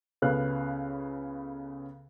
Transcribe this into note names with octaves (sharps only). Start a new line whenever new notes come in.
C#2 C#3 B3 A4 F5 F#6